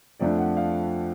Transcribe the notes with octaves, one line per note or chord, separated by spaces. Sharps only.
F2 F3 A3 D4 D5
F#5
F5